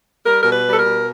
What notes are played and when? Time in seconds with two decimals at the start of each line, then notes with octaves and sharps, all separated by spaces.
0.23 G3 A#4
0.41 B2 A#4
0.51 B4
0.64 G3
0.69 A4
0.77 A#4
0.84 B2